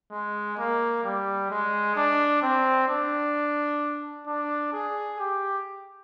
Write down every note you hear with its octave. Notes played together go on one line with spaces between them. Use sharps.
G#3
A#3
G3
G#3
D4
C4
D4
D4
G#4
G4